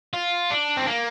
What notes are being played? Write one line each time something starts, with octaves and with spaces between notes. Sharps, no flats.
F4
D4
C4
A#3